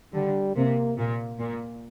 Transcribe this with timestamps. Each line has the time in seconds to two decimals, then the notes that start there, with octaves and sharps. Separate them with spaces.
0.14 D3 G3
0.56 C3 A#3
0.98 A#2
1.39 A#2